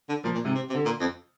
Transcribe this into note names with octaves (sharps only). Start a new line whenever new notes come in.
D3
A#2 F3
A#2
G#2 C3
C3
C3
D3
A#2
F2